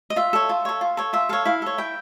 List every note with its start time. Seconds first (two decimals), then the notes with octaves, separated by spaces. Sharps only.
0.10 D#5
0.16 F4 E5
0.33 A4 C#5
0.49 F4
0.65 A4 C#5
0.81 F4
0.97 A4 C#5
1.13 F4 E5
1.29 A4 C#5 F5
1.45 E4 F5
1.62 A4 C#5
1.78 E4 G5